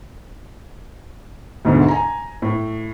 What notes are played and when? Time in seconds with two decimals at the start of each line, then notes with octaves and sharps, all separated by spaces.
1.65 D2 G#2 B2 D3
1.88 G#5 A#5
2.42 A2